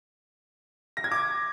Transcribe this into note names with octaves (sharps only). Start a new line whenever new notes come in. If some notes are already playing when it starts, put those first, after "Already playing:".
A#6
G#6
D6